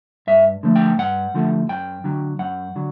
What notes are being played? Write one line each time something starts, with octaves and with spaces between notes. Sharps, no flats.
G2 E5
D3 F3 A3
G5
G2 F#5
D3 F3 A3
F#2 G5
D3 F#3
F#2 F#5
D3 F#3